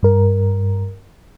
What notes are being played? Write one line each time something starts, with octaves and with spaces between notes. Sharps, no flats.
G2 A#4